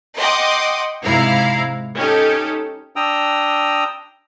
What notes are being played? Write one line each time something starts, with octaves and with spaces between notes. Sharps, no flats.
D#5 F#5 G5 C6 D6 D#6
G#2 C3 E4 F5 A#5
C#4 D#4 G4 A4
D4 G5 A#5 D#6 E6